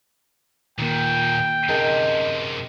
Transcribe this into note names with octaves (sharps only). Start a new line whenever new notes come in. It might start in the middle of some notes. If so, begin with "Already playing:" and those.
D#2 A#2 D#3 A#3 G5
F#2 C3 D#4 G#4 A#4 A5